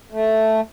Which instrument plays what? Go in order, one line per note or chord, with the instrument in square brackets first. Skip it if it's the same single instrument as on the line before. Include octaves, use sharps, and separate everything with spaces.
[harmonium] A3